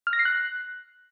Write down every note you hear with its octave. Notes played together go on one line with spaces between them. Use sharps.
F6
A#6
C7
F#6